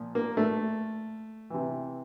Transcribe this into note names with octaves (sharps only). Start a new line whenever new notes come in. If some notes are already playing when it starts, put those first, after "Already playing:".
Already playing: A#2 F3
A#3
A3
C3 E3